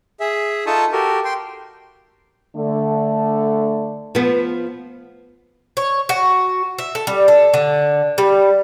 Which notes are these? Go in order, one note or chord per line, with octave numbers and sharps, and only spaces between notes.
G#4 E5
D#4 F4 A4 A5 C#6 D#6
F#4 G4 A4 A#4
G5 C6
D3 A3
F3 B3
C#5
F#4
E5
A4
G3
A4
D3
G3